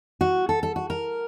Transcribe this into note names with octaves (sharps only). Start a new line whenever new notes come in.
F#4
A4
A4
F#4
A#4